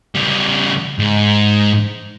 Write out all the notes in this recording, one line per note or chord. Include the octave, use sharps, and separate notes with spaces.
C#3 G3
G#2